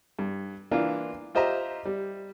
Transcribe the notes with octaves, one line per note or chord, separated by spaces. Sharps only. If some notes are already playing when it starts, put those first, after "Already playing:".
G2
E3 A#3 D4 F4
F4 G4 C5 D#5 E5 A#5
G3